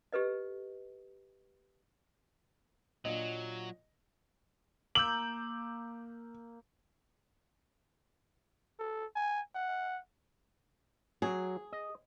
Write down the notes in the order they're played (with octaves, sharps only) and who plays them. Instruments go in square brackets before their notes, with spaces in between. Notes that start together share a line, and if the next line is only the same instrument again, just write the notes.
[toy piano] G4 A4 B4 D#5
[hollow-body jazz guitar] A#2 D4 F4 [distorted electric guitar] F#3 [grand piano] D#5
[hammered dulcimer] A#3 [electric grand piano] D6 E6 G6 [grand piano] F#7
[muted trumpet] A4
G#5
F#5
[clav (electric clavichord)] F#3 [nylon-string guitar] G#4
[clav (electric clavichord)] D#5